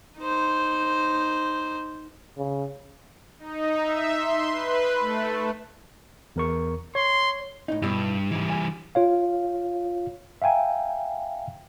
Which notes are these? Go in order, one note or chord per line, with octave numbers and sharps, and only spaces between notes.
D#4 C5
C#3
D#4
E5
C6
B4
A3
E2 A#4 C#6
C#5 C6
A2 D#4
B1 G2 B2 E4
G#2 E3 G3
G#5
F4 C#5 F5
E5 F5 G5 G#5 A#5